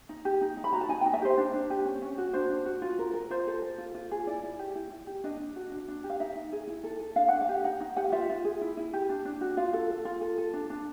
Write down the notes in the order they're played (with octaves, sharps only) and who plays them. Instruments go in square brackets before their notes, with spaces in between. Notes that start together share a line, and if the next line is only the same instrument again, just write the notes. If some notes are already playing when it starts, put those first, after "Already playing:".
[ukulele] D#4
G4
D#4
D#4
B5
F#4 A#5
A5
D#4 G#5
G5
D#4
E5
G4 C5
D4
D4
G4
C#4
C#4
F#4
D4 C5
D4
F#4
F4
A#4
A#4
F4 C5
A4
A4
F4
F4
G#4
E4 D5
E4
G4
E4
E4
G4
D4 D#5
D4
F#4
D4
D4
G4
F5
D#4 E5
D#4
G#4
E4
A4
A4
D4 F5
D4 F#5
F5
G4
D#4 F#5
D#4
G4 F#5
F5
F4 E5
F4
G#4
E4
E4
G4
D4
D4
F#4
F4 F5
A4
A4
F4
A4
A4
D4
D4